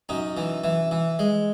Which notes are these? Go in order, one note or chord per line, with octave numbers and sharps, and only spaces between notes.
F#2 D#4
E3
E3
E3
G#3